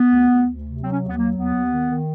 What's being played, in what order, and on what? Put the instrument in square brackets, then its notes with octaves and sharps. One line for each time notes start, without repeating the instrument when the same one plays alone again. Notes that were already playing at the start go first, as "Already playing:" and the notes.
Already playing: [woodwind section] B3
D2
D2
D2
C3
F#3 C4
C#4
D#2
B3
F#3 A#3
D#2 B3
D#2
D#3
D#3